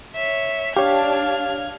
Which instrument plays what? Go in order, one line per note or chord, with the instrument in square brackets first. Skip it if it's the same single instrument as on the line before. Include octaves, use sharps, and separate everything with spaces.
[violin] C#5 E5
[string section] D4 [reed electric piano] G4 C#5 [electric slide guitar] F5 [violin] F6 G#6